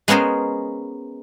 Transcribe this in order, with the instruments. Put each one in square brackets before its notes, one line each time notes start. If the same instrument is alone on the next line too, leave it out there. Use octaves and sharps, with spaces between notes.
[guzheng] G#3 B3 C#4 A#4 C5